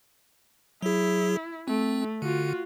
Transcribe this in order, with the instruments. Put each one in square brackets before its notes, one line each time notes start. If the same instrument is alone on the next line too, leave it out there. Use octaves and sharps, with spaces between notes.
[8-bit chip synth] F#3 G#4 [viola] E4
[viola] A3 [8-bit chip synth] C4
[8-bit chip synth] D3 [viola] F4 F#4